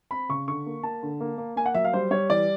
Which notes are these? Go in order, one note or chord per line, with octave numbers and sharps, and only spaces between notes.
C4 B5
C#3 C#6
D3 C#6
A#3
A#3 A5
D3
A#3
A#3
A#3 G#5
F#5
F#3 E5
F5
G3 C5
G3 C#5
E3 D5